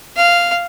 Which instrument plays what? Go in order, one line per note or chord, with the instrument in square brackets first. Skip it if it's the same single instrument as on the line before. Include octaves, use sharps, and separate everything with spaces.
[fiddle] F5